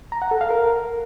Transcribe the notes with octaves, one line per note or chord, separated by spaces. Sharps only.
A#5
F#5
A4
F5
A#4